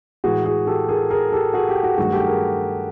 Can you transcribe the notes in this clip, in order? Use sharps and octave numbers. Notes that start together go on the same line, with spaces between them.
A2 E3 G#3 F#4 G#4
F#4 G#4
G4 A4
G#4 A#4
G#4 A#4
G4 A4
F#4 G#4
G4
F#4 G#4
G2 D#3 F#3 A3 F#4 G#4
G4 A4
G#4 A#4